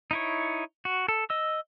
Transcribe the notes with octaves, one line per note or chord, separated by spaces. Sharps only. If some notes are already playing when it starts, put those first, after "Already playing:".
D#4 E4 C#5
F#4
A4
D#5 E6